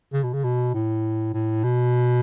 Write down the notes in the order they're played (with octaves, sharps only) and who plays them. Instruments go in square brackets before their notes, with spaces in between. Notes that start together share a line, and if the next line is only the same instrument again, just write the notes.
[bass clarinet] C#3
B2
C#3
B2
A2
A2
B2